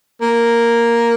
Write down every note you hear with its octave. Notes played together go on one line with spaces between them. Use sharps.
A#3